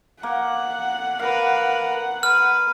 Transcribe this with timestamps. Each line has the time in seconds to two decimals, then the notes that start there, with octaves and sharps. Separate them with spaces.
0.23 A#3 F#5
1.19 A#4 B4 F5
2.23 B4 F6